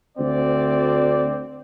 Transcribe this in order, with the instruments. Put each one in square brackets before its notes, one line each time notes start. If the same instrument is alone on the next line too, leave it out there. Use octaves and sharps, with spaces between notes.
[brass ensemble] D2 C4 D5